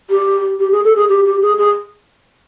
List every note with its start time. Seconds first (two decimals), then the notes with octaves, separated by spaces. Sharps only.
0.10 G4
0.59 G4
0.72 G#4
0.84 A4
0.96 G#4
1.09 G4
1.25 G4
1.42 G#4
1.58 G#4